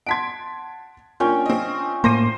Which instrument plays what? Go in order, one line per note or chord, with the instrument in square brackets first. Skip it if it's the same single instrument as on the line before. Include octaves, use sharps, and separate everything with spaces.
[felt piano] F#5 A5 C6 [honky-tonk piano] G#6 B6 D7
[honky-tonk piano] A#3 [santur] C#4 G5 [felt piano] D4 F4
[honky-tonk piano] C4 D#5
[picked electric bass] A2 A#3 [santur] C5 [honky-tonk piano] D6 A#6 D#7